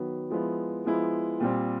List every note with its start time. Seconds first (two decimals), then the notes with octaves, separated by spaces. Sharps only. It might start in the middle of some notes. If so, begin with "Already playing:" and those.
Already playing: D#3 F#3 B3
0.30 F3 G#3 B3 E4
0.85 F3 G#3 B3 E4
1.40 A#2 G3 C4